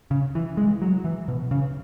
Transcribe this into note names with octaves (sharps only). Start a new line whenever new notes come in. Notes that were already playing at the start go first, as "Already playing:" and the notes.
C#3
E3
G#3
F#3
E3
B2
C#3